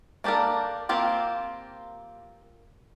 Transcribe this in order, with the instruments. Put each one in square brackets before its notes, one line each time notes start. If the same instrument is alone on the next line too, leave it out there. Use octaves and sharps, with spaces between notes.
[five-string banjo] A#3 D4 G4 A4 A#4
A#3 C4 F4 G4